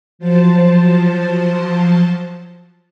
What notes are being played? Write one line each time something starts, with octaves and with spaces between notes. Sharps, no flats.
F3 F#3 C5 A5